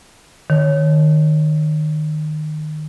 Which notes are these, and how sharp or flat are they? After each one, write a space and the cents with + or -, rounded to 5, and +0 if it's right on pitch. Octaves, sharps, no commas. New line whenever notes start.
D#3 -20 C#5 +0